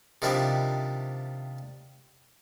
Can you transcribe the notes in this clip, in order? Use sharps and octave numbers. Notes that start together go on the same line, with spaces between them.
C3 D#3 F3 G3 D4 E4